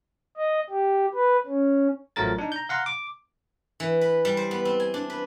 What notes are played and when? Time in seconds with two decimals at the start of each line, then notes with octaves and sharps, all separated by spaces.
0.37 D#5
0.70 G4
1.15 B4
1.46 C#4
2.16 A1 F3 F#3 A3 A#4 A6
2.38 D4 D#4
2.52 A#5 G6
2.69 F5 F#5 A#5 C6
2.86 D6
3.80 E3
4.01 B4
4.25 G3
4.37 C5
4.51 B3
4.65 C4
4.80 G#5
4.94 D4
5.10 B4